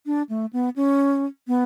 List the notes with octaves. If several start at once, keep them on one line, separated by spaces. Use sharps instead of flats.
D4
A3
B3
C#4
B3